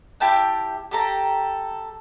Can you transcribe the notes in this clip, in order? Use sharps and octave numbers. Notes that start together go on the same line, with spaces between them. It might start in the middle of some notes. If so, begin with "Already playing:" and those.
E4 G4 A5 G6
G4 A4 A#5